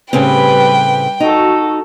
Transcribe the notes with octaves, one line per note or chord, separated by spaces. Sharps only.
A2 C#3 G3 C4 B4 G5
D#4 F#4 A4